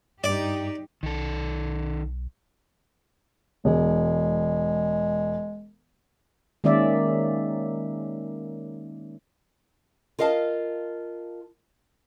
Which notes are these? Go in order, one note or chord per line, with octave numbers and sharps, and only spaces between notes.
G2 D#4 G4 D5
B1 D#3 A4
E1 G#3
D#3 G#3 A#3 C#4 D5 E5
F4 A#4 D#5 F5 A5